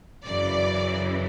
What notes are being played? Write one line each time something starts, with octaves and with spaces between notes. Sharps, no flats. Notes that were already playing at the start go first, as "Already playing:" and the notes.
F#2 C#3 E3 D5